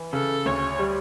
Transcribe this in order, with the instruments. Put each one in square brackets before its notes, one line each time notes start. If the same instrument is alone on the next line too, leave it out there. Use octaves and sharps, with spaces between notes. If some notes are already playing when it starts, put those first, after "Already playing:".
Already playing: [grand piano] E3
[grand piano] C#3 [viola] A4
[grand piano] D2 [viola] C#5
[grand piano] G3